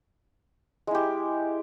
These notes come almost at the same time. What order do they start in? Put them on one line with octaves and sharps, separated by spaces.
G#3 E4 G4